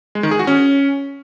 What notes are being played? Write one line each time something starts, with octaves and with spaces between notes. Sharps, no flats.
G#3
D#3
G#4
F#4
C#4